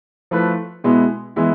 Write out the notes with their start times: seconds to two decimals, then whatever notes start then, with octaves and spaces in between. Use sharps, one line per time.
0.31 F3 A3 E4 B4
0.84 B2 G#3 B3 E4
1.36 E3 G#3 B3 E4